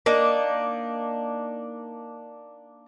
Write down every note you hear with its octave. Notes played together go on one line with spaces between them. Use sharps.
A#3 D4 D#4